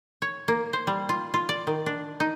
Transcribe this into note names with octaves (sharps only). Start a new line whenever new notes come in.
C#5
A#3
C5
G3
F4
F4
D5
D#3
D4
D#4